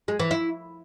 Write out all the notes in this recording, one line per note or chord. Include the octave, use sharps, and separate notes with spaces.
G#3
E3
E4